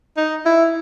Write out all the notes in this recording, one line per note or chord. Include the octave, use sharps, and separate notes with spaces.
D#4
E4